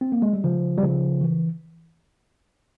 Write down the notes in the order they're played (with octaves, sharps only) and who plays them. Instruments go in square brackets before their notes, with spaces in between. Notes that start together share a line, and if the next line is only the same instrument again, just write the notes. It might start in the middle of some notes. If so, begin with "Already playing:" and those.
[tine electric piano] C4
A#3
G#3
G3
C#3 F3
G3
C#3 F3
E3